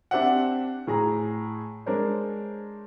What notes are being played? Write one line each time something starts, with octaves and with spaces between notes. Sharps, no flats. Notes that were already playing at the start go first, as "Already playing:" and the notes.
C4 D4 G4 C5 E5 F#5
A2 G#4 A#5
G#3 D4 A#4 C5 C#5